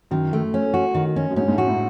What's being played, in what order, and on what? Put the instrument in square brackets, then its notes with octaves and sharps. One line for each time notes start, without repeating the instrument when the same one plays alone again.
[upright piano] F#2 [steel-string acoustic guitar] D#3
[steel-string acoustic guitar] A3
C#4
F#4
D#3
C#4
[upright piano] F#2
[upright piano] G#2 [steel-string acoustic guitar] C#4
[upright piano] G#2
A2
[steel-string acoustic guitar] F#4
[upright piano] A2